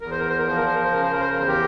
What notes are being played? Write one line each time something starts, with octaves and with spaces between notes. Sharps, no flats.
E2 A#4
C5
A#4
C5
A#4
F3 C5
A#4
C5
A#4
C5
C#3 A#4
C5
A#4
C5
A#4
E2 C5
G4 A#4